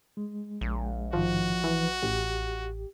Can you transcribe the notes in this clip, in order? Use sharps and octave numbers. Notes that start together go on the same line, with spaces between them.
G#3
A#1
G#2 D#3 F3 F#4
E3 F3 B4
A1 G4